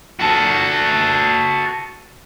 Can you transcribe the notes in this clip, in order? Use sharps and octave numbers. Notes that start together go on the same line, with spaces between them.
F#4 A4